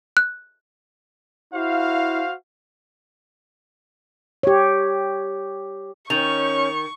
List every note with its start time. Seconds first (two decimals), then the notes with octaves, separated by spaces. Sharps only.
0.17 F#6
1.54 E4 F#4 C5 F5
4.43 G4 C#5
6.10 D#3 C#4 C#6 G6 F7